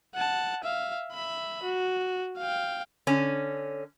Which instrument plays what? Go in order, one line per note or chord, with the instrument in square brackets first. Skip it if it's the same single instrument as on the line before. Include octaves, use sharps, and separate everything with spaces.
[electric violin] F#5 A5
E5 F5
E5 B5
F#4
F5 G5
[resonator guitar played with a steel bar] D3 C#4